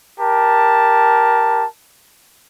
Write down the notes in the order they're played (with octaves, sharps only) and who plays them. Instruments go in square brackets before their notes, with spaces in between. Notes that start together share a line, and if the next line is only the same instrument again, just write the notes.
[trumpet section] G4 A#4 A5